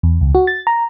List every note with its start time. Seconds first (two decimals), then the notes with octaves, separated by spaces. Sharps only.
0.03 E2
0.21 C#2
0.35 F#4
0.47 A6
0.67 A#5